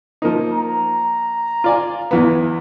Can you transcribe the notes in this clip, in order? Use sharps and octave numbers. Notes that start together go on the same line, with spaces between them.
F3 A#3 D#4
A#5
F4 D5 G#5
E2 E3 B3